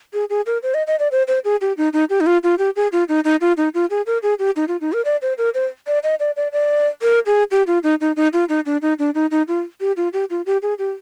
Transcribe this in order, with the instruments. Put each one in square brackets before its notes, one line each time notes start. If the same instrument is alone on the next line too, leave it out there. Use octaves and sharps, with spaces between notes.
[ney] G#4
G#4
A#4
C5
D#5
D#5
D5
C5
C5
G#4
G4
D#4
D#4
G4
D#4
F4
F4
G4
G#4
F4
D#4
D#4
F4
D#4
F4
G#4
A#4
G#4
G4
D#4
F4
D#4
A#4
D5
C5
A#4
C5
D5
D#5
D5
D5
D5
A#4
G#4
G4
F4
D#4
D#4
D#4
F4
D#4
D4
D#4
D4
D#4
D#4
F4
G4
F4
G4
F4
G4
G#4
G4